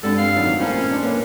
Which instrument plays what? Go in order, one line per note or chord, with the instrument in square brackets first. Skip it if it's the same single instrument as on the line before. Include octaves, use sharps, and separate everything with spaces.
[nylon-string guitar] G2 G4 [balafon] G#3 C4 D4 [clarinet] A4
[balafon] D4 [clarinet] F5
[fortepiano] A2 D#3 F#3 [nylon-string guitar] E3
[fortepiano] A#1 F4 A5 [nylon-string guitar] C4 [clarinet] C#4
[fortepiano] D4 C6
[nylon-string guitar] F#3 A#3 [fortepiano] A4 B4 [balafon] C#5